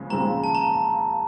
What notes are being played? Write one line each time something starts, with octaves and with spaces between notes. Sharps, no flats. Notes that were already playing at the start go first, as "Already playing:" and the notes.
Already playing: D#2 C#3 F3 G#3
D#2 C#3 F3 G#3 C4 A#5
A5
A#5